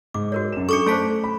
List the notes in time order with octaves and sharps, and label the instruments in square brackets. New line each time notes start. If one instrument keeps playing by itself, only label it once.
[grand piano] G#2 [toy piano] D6
[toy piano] F#4 A#4 C#5
[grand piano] F#2 E7
[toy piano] D4 A4 [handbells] C#6 D6 C#7
[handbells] A3 A4 B6 [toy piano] C5 A5 C6
[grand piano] B5